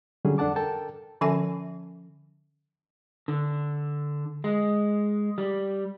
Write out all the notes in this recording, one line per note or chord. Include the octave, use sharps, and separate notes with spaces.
D3 F#3 G3 C#4 G#4
F2 D4 A4 F#5 A5 D6
A4 A#4 G5 A5
D3 F3 C#4 A4 E5 G#5
D3
G#3
G3